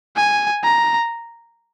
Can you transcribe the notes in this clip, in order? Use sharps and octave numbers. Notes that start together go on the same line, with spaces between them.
G#5
A#5